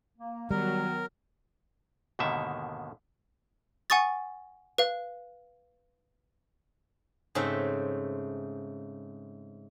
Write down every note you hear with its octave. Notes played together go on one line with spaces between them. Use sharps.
A#3
D#3 F#3 G3 B3 A#4
D#2 G#2 B2 D3 D#3 E5
F#5 G#5 C#6 D#6 A6
B4 F5
G#2 C#3 A3 C4 E5